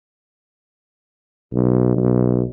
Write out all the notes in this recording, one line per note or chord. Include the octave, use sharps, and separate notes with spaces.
B1
B1